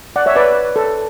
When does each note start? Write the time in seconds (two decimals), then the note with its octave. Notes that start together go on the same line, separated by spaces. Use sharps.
0.16 D5 F#5
0.26 C#5 E5
0.36 B4 D5
0.76 A4